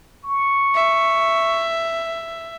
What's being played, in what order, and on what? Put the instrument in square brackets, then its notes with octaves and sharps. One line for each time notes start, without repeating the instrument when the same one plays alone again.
[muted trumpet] C#6
[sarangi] E5